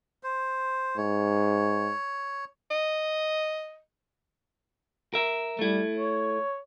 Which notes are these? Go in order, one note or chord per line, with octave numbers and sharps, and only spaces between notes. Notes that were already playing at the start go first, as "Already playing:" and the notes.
C5
G#2 C#5
D#5
A#4 E5
G3 A3 E4
C#5